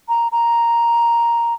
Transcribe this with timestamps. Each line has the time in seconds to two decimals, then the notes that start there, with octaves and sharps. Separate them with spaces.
0.09 A#5
0.32 A#5